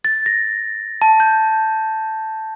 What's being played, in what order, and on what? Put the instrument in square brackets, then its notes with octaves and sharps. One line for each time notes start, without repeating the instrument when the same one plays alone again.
[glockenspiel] A6
A#6
A5
G6